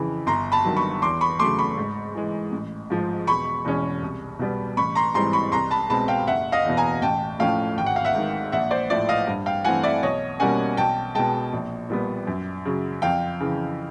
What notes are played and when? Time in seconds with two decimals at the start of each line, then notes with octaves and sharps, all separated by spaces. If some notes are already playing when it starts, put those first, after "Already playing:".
Already playing: F2 C#3 E3
0.27 G1 A#5 C6
0.52 A5 B5
0.64 G2 D#3 F#3
0.77 B5 C#6
1.02 E2 C6 D6
1.21 B5 C#6
1.39 C#3 F#3 A3 C6 D6
1.59 B5 C#6
1.77 G#2
2.15 E3 G#3
2.52 A1
2.90 G#2 F3
3.27 E1 B5 C#6
3.65 E2 B2 G#3 C#4
4.02 C2
4.39 B2 G3 B3
4.77 A1 B5 C#6
4.95 A#5 C6
5.14 G#2 E3 G3 C4 A#5 C6
5.33 B5 C#6
5.52 C2 A#5 C6
5.71 A5 B5
5.90 B2 G#3 C4 A5 B5
6.08 F5 G5
6.27 F#1 E5 F#5
6.52 D#5 F5
6.65 E2 B2
6.77 G#5 A#5
7.02 A1 G5 A5
7.39 A2 F3 A3 C#4 F5 G5
7.77 G#1 G5
7.86 F#5
7.96 F5
8.05 E5 F#5
8.15 G#2 D#3
8.52 A#1 E5 F#5
8.71 C5 D5
8.90 A2 F3 D5 E5
9.09 D#5 F5
9.27 G2
9.46 F5 G5
9.65 E3 A3 C4 F#5 G#5
9.83 D5 E5
10.03 B1 C#5 D#5
10.40 B2 G3 A#3 C#4 F#5 G#5
10.77 B1 G5 A5
11.15 B2 G#3 G5 A5
11.53 A#1
11.90 A#2 G3 B3
12.27 F#2
12.65 C#3 F#3
13.02 F2 F5 G5
13.40 C#3 E3